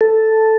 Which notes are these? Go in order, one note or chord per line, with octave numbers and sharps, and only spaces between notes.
A4